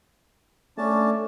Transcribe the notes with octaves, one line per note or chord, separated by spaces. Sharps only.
A3 C#4 D4 A5